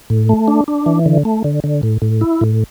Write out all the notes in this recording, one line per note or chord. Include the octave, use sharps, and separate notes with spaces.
A2
A3
D4
D4
E3
D3
A3
D3
D3
A2
A2
E4
A2